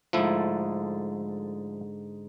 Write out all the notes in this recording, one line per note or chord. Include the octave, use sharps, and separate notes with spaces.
G#2 D3 F3 A3 E4